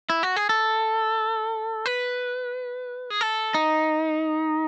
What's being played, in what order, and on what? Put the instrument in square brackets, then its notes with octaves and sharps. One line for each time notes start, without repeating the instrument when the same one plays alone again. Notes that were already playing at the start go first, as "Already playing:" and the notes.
[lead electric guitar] E4
F#4
G#4
A4
B4
G#4
A4
D#4